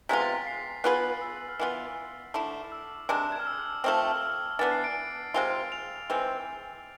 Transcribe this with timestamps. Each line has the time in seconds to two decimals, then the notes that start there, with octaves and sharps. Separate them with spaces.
0.09 C3 G#3 B3 F4 B6
0.21 A6
0.33 B6
0.47 C7
0.84 B3 F4 G#4 B4
1.22 E6
1.49 F6
1.59 E3 B3 F4 E6
2.34 D3 A3 E4 D6
2.72 E6
3.09 C3 G#3 D4 D6
3.32 G#6
3.39 F6
3.47 E6
3.84 F3 A3 C4 F6
3.97 E6
4.09 F6
4.22 F6
4.59 E3 B3 D4 A6
4.71 C7
4.84 D7
5.34 C3 G#3 C4 F4
5.72 F7
6.10 E3 G#3 C4